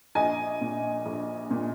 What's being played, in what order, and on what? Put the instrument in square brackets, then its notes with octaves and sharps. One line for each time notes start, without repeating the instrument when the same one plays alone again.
[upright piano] A#1 D#5 G#5
A#2
A#1
A#2